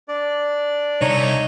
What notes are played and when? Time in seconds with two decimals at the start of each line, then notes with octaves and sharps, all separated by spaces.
0.08 D4 D5
1.01 C2 D#4 C#5